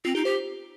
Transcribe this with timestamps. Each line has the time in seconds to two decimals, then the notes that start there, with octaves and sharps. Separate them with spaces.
0.05 C4 F4
0.15 D#4 G4
0.25 G4 C5